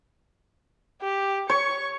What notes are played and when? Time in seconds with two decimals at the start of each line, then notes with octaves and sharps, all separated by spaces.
1.02 G4
1.50 C#5 C#6